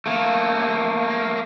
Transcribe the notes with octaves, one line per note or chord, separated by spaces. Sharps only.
A3 A#3